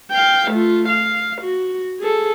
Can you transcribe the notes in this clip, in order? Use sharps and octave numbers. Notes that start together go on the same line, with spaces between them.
F5 G5
A3 F4
F5
F#4
G#4 A4